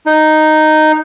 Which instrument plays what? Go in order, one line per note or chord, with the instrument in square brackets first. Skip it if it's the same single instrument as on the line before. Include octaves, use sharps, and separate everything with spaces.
[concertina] D#4